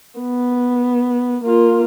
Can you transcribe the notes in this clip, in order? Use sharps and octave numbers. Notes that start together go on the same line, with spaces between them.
B3
A#3 F4